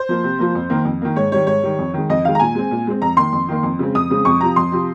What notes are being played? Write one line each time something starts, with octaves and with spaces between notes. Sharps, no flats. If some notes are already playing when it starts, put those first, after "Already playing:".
Already playing: C5
F3 A#3
C3
F3 A#3
F2
D#3 A#3
F2
D#3 A#3
G#2 C#5
D#3 G3 C#5
G#2 C#5
D#3 G3
F2
D#3 G#3
F2 D#5
D#3 G#3 F5
A#5
A#2 G#5
G#3 C4
A#2
G#3 C4
F2 A#5
D#3 A#3 C6
F2
D#3 A#3
F2
C#3 G#3 C4
F2 D#6
C#3 G#3 C4
F2 C#6
C3 F3 A#5
F2 C6
C3 F3